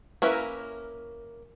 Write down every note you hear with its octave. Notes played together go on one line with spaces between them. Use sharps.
A#3 C#4 E4 A#4 B4